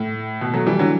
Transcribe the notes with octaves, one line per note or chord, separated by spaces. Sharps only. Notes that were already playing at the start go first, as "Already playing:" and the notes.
Already playing: A2
B2
F#3 A3
E3 G3
D3 F#3